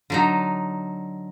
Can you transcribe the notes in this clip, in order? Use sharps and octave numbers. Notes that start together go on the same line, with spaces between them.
D3 F#3 D#4